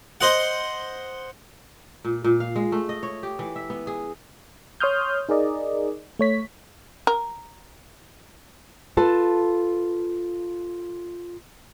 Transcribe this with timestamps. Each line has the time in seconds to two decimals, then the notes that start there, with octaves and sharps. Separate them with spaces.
0.21 C5 D#5 F#5
2.05 A#2
2.24 A#2
2.40 F5
2.56 G#3
2.72 A3
2.89 D#5
3.03 C#5
3.23 G4
3.39 E3
3.56 E5
3.70 B3
3.87 G#4
4.80 C#5 C6 D#6 F6 G6
5.29 D#4 G#4 A#4 D5 D#5
6.19 A3 C#5 B6
7.07 A#4
8.97 F4 A4 B4 A5